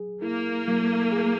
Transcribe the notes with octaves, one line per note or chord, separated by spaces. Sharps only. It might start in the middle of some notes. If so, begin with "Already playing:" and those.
Already playing: F#3 G#4
A#3 E4
F#3
G#4